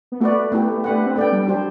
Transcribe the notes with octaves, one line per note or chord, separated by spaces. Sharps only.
B3
A3 F#4 B4 D5
B3 E4 G4
D4 G4 B4 F#5
C4
B3 D4 A4 D5 G5
G3
F#3 D4 G4 C5